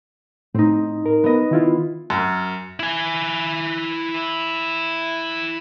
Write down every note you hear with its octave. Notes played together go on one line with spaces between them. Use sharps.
A2 C4 D#4
A#4
B3 D#5
D#3 E4 F4
F#2
E4 G#5